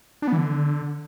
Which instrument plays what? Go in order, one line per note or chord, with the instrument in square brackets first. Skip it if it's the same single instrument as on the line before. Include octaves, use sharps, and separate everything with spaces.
[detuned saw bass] D4
B3
E3
D3